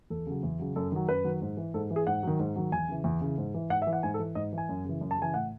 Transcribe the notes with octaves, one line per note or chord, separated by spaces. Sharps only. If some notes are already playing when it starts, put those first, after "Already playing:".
E2 A4
C#3 F#3
E2
C#3 F#3
F#2 A4
D#3 F#3
F#2 B4
D#3 F#3
G#2
E3
G#2 A4
E3
G#4
G#2 F#5
D#3 F#3
G#2
D#3 F#3
E2 G#5
C#3 E3
E2
C#3 E3
G#2
E3
G#2 F#5
E5
E3
F#5
G#2 G#5
A4
E3
G#2 D#5
E3
G#5
F#2
C#3 E3
F#2
A5
C#3 E3 G#5
A2 F#5